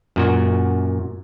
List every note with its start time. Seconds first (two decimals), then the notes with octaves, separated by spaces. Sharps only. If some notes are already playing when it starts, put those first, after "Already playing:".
0.16 F#2 A#2 F#4